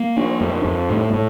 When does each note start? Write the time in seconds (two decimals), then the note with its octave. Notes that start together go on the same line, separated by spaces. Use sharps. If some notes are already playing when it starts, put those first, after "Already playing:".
Already playing: A#3
0.16 D4
0.40 F2
0.65 F2
0.89 A2
1.13 A2